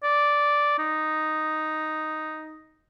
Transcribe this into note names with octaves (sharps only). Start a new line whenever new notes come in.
D5
D#4